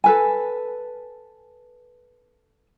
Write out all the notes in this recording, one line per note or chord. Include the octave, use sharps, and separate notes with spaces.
A4 B4 G#5